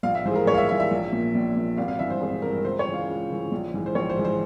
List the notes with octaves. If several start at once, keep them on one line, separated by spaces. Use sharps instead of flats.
A#1 F5
E5
G#2 E3 C5
G#4
A#4
A#1 C#5
F5
E5
G#2 E3 E5
E5
A#1
A#2
A#1
A#2
G#1 F5
F5
G2 E3 E5
C5
G#1 G#4
G2 E3 A#4
C#2 C5
C#5
C#3 E3
F5
C#2
C#3 E3
A#1
G#2 E3
C5
A#1 C#5
C5
G#2 E3
C5